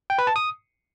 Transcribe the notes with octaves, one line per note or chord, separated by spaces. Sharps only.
G5
B4
A5
D#6